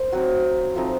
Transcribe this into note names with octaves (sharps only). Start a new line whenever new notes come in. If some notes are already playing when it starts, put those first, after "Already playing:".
Already playing: A#3 C5
F#3 C4 D#4 F#4
F3 A3 C4 D#4